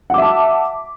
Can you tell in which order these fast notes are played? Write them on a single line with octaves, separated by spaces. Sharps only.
F#5 D6 E5 A5